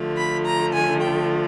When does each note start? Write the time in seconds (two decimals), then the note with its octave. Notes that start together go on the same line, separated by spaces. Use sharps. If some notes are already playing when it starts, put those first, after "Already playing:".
Already playing: D3 F3 A3
0.17 B5
0.45 A#5
0.73 G#5
1.01 G5